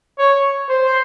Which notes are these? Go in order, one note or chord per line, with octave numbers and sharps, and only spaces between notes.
C#5
C5